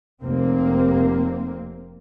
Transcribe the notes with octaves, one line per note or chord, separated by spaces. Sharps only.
F1 A#3 C4